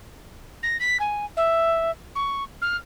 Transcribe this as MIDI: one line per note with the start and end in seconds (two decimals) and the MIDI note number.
0.63 0.77 94
0.80 0.97 95
1.00 1.25 80
1.36 1.91 76
2.15 2.43 85
2.61 2.76 89